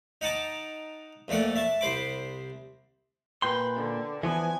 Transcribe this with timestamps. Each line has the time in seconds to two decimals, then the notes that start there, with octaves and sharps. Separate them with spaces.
0.21 D#4 F#5 A5 D6
1.28 F2 A#2 A3 D5 F#5
1.56 E5 A5
1.81 C2 C5 B5 D6
3.42 A#2 B4 G5 C6
3.77 D3
4.23 E3 F3 B3 G#5